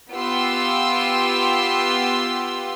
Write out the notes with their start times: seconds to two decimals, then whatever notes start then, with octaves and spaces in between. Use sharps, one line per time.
0.14 B3 F4 G4 C6 E6